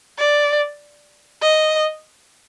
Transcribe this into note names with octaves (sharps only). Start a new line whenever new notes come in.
D5
D#5